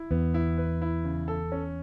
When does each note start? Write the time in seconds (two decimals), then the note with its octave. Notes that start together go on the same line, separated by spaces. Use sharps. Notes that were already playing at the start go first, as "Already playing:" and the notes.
Already playing: E4
0.11 E2 B3
0.34 E4
0.58 B4
0.82 E4
1.04 C#3
1.28 A4
1.52 C#4